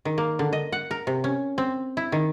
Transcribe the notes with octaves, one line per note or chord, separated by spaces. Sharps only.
D#3
A#3
D3
D#5
F#5
A#4
C3
C#4
C4
E4
D#3